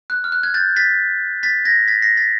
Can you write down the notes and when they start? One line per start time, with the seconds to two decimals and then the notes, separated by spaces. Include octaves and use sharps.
0.10 F#6
0.24 F6
0.32 F#6
0.43 F#6 G#6
0.54 G6 A6
0.76 A6 B6
1.43 A6 B6
1.65 G#6 A#6
1.88 A6 B6
2.02 A#6 C7
2.17 A6 B6